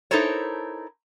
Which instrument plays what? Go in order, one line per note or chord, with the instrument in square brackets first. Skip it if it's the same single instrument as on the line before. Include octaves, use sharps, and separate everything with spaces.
[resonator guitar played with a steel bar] D#4 E4 A4 A#4 C5 C#5